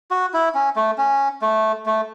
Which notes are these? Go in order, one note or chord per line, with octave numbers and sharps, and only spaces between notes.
F#4
E4
C#4
A3
C#4
A3
A3